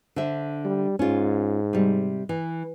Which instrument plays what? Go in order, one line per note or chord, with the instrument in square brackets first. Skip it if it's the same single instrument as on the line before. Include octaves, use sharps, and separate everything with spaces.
[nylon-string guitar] D3 C5 E5
[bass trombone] G3
[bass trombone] G#2 [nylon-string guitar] C#4 F4
[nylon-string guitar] C3 G3
E3